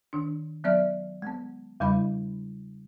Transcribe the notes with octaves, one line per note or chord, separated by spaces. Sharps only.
D#3 D4
F#3 B3 D5 E5 F6
G#3 B3
E2 C#3 G3 E4 D#5 B5